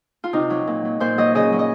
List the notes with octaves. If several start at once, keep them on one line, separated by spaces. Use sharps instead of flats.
F4
C3 D#4
F#3
A#2
F#3
A#2 C5
F#3 D#5
C#3 D#5
F#3
D#5